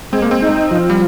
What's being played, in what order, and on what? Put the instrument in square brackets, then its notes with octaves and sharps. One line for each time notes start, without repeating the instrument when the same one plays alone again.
[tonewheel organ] G#3 [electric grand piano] C4
[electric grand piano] A#3
C4
[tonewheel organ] D#4
F3
[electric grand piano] G3